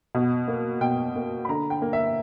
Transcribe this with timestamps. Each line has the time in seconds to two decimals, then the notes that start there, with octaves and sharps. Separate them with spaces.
0.15 B2
0.48 A#3
0.81 B2 G5
1.15 A#3
1.45 B5
1.49 D3 A#5
1.70 G5
1.82 A#3
1.93 E5